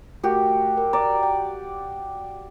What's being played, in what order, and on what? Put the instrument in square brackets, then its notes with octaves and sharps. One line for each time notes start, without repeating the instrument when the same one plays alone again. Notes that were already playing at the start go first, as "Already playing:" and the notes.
[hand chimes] A3 A#4 [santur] F#4 G4
[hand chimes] A#4
[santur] D5 [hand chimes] A#5
[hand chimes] G5